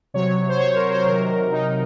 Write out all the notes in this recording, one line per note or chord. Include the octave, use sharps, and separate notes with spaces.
C3 F#3 C#5
C5
C#5
A#4
C5
C3 D#3 F#3 A#4
D#4